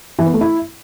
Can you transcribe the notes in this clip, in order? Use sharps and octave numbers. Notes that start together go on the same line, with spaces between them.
E3
B3
A3
E4